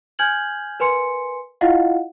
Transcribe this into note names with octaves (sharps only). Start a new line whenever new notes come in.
G#5 F6 G6 G#6 F#7
A#4 B4 G#5 C6 C#7
E4 F4 D#5 F5 F#5